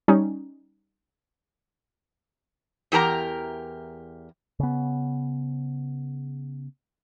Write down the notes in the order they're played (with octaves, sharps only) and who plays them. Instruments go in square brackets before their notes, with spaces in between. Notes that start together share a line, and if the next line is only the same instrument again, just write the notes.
[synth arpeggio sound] G3 C#4 D#4
[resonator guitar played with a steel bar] E2 G4 A#4 A5 A#5
[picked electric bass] C#3 B3